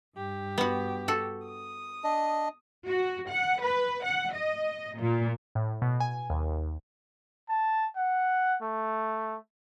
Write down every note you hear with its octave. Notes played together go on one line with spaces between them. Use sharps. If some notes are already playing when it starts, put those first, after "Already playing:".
G2 G4
B3 F#4
F#4 A4
D#6
D4 D#5
F#4
F#5
B4
F#5
D#5
A#2
A2
B2
G#5
D#2
A5
F#5
A3